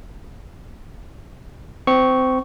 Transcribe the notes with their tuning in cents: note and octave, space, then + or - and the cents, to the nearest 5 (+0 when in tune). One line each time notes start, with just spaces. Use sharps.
C4 -20 C#6 +0